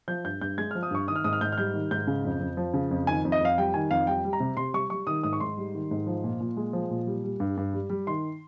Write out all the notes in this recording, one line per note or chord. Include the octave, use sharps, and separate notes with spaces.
F3 G6
G2 G6
G2 G6
G#3 G#6
F3 F6
D#6
G2 C#6
D#3 D#6
F6
G#2 D#6
F6
G#2 G6
F6
G3 G6
D#3
G#2 G6
C#3
F2
F2
F3
C#3
F2
D#3 G#5
F2
D#5
F2 F5
G3 G5
D#3 G#5
F2 F5
G3 G5
G3
A#5
C3
C3 C6
G3 C#6
G3 C#6
D#3 D#6
G#2 D#6
C#6
G#2 C6
G3
D#3
G#2
F3
A#2
A#2
G#3
F3
A#2
G3
G3
G2
G2
G3
G3
D#3 C6